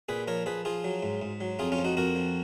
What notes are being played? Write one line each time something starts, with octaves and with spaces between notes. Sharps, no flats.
A#2 G#4 B4
F3 A#4 C#5
F3 G#4 B4
F3 F4 G#4
F#3
G#2
G#2
F#3
F2 F4 G#4
C#4 F4
F3
D#4 F#4
F2 F#4 A#4
F3